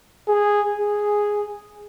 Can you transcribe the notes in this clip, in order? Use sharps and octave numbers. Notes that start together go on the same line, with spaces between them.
G#4
G#4